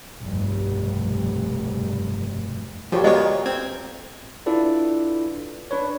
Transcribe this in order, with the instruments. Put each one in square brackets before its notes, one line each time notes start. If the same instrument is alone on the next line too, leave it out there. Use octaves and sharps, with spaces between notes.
[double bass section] F1 B1 G2 C3
[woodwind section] D2 A#2 D3 [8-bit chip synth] F3 [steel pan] F#4 G4 C#5
[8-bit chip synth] G#3 B3 C#5 [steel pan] A#4 A#5 D6 [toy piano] D#5
[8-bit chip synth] C4 G#6
[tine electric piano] D4 E4 F4 A4 B4 D5
D4 B4 C#5